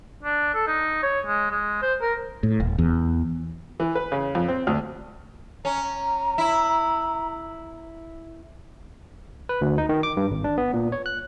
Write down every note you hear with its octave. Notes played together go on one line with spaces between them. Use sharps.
D4
A4
D#4
C#5
G#3
G#3
C5
A#4
A2
D#1
E2
E3
B4
C#3
F2
C4
D2
C#4 A#5
E4
B4
D2
D#4
D#3
D6
G2
G#1
D4
B3
A#2
C#5
F#6